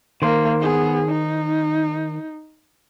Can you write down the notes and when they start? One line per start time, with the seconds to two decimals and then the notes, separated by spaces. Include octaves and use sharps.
0.22 D#3 A#3 C5
0.60 B3 G#4
1.08 D#4